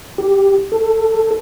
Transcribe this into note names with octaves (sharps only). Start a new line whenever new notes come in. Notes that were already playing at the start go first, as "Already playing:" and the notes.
G4
A4